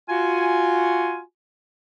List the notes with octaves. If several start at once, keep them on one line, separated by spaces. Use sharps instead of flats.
F4 F#4 G#5